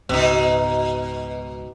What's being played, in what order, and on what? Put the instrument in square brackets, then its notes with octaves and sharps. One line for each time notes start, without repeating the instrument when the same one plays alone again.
[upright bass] C#2 G#2 [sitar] B2 D#4